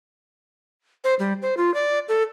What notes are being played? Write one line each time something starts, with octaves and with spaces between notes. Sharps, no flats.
C5
G3
C5
F4
D5
A4